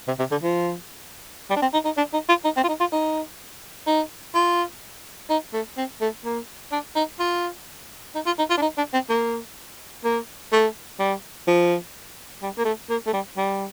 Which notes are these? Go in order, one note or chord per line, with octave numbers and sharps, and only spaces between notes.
C3
C3
D3
F3
G3
D4
C4
D#4
D#4
D4
D#4
F4
D#4
C4
F4
D#4
F4
D#4
D#4
F4
D#4
A3
C4
A3
A#3
D4
D#4
F4
D#4
F4
D#4
F4
D4
D#4
D4
C4
A#3
A#3
A3
G3
F3
G3
A#3
A3
A#3
A3
G3
G3